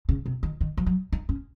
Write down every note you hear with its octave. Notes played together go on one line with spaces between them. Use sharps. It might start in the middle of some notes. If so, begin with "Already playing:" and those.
C#3
C3
D#3
D#3
F3
F#3
D#4
C#4